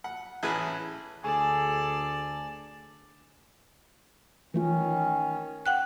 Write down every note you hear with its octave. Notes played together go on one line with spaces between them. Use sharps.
F#5
A1 E3 G#4 B4
D2 G#4 A4 D5 G#5 A5
D#3 E3 A3 C#4 F4
F#5 G5 F#6